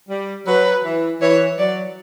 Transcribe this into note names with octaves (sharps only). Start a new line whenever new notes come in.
G3
F#3 B4
E3
E3 C#5
F#3 D5